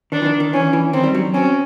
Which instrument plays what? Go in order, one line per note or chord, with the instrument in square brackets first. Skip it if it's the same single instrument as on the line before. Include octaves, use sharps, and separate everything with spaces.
[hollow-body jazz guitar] D#3 [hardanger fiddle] D4
[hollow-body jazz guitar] E3
D#3
D#3
[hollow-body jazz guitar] E3 [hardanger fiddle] C#4
[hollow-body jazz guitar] E3
[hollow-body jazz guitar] D#3 [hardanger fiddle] C4
[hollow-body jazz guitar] G3
F#3
[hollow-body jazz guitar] C4 [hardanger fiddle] C#4